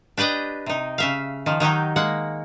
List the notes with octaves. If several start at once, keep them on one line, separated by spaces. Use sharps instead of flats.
D4 G4 B4 D5 D#5
C3 D#4
C#3 E5 F5
D#3 F3
D#3 F#3 D#4 G4
G#3 A#3 F#5